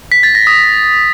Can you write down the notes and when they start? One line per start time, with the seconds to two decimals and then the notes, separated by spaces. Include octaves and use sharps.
0.12 B6
0.23 A6
0.35 A#6
0.47 D#6